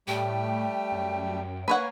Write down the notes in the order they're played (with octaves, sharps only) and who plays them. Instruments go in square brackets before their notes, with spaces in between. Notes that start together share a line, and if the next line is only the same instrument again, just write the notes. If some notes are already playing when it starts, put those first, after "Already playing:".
[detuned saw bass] A2 [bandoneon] G3 A3 G4 [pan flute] G5
[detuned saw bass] F#2
[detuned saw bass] A#3 [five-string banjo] B4 C#5 F#5 [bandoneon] G#5